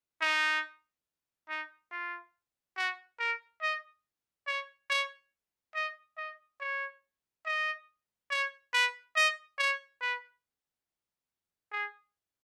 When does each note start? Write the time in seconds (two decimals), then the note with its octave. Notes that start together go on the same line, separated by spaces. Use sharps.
0.21 D#4
1.49 D#4
1.91 F4
2.77 F#4
3.19 A#4
3.62 D#5
4.47 C#5
4.90 C#5
5.75 D#5
6.18 D#5
6.60 C#5
7.46 D#5
8.30 C#5
8.73 B4
9.16 D#5
9.58 C#5
10.01 B4
11.72 G#4